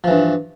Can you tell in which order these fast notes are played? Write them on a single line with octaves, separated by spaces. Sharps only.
F3 E3 G2